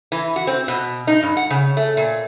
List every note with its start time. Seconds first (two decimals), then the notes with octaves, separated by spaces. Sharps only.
0.12 E3
0.36 F#4
0.47 C4
0.68 B2
1.07 D#4
1.23 G2
1.37 F#5
1.50 C#3
1.77 A3
1.97 A#2